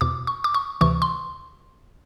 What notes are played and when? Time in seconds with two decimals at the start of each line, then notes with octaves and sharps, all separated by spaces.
0.01 E2 B2 D6
0.27 C#6
0.44 D6
0.54 C#6
0.81 D2 C3 E3 C#6
1.02 C6